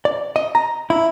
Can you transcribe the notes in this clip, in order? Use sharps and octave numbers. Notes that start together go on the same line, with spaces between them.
D5
D#5
A#5
E4